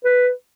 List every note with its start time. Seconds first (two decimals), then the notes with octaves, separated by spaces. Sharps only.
0.05 B4